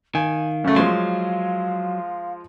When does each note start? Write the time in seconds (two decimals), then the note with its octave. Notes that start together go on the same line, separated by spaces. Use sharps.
0.15 D#3 F5 G#5
0.64 F#2 C#3 A3
0.76 F3 F#3 G#3 C6